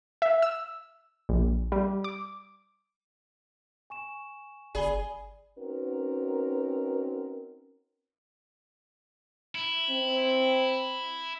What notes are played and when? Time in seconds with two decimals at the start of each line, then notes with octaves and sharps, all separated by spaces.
0.22 E5
0.42 E6
1.29 A#1
1.72 G3
2.04 D6
3.90 G#5 C#6 E7
4.75 G1 G#4 D5 B5 G7
5.59 C4 C#4 D#4 F#4 A#4 B4
9.55 E4
9.90 C4